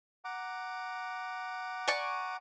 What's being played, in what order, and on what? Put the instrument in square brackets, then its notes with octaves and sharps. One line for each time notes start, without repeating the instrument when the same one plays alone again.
[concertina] F#5 A#5 D6
[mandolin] D5 G#5 C#6